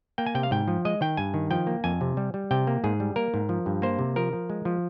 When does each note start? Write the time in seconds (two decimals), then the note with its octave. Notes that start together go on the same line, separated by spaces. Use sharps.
0.18 A#3 G5
0.26 G#5
0.35 C3 G5
0.43 F5
0.51 G#2 G5
0.68 F3
0.85 G#3 D#5
1.01 D#3 G5
1.17 G2 G#5
1.34 D#3
1.50 F3 G5
1.67 A#3
1.84 F2 G#5
2.01 C3
2.17 G3
2.34 G3
2.51 C3 G5
2.67 A#3
2.84 G#2 G#4
3.00 G3
3.16 A#3 A#4
3.34 G#2
3.49 F3
3.66 G2
3.82 A#3 C5
3.99 C3
4.16 F3 A#4
4.33 F3
4.50 G#3
4.65 F3